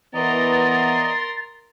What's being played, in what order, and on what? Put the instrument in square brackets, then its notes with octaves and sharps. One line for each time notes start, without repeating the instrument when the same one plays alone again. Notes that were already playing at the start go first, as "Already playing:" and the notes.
[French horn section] E3 B3 [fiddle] A#4 C6 [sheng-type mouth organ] D5 D#5 A#5 [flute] A6